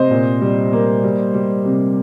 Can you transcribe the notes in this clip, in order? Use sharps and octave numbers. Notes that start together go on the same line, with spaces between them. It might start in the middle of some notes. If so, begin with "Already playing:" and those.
Already playing: C3 C5 D#5
A#2
G3
A#3
G3
G3
C3